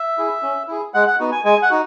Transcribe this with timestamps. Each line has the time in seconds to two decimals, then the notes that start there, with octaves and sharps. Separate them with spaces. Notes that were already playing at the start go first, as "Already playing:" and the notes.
Already playing: E5
0.18 E4 G#4
0.43 C#4
0.68 E4 G#4
0.94 G#3 F#5
1.07 F#5
1.19 B3 D#4 F#4
1.32 G#5
1.45 G#3 G#5
1.62 F#5
1.70 D#4 F#4